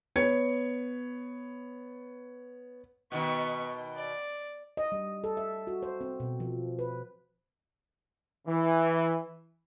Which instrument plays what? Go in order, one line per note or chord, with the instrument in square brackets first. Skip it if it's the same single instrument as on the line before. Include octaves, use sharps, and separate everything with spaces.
[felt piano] B3 C#5 G#6 C#7
[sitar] B2 D#3 [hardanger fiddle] B3 C#6
[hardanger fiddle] D5
[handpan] D#5
G3
A4
E5
F#4
C5
C4
B2
F3
B4
[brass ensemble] E3